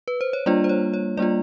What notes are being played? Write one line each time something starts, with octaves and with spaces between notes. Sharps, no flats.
B4
C5
C#5
G3 A#3 D4 F4 D5
C5
C#5
C#5
G3 A#3 D4 F4 D5